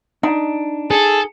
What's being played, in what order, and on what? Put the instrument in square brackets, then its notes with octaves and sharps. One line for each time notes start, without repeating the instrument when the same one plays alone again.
[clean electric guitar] D4 [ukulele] D#4
[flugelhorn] G#4 [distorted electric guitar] A4